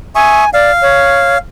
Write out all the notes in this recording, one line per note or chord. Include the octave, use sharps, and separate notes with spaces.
E5 G#5 C#6 D#6
D5 F5
C#5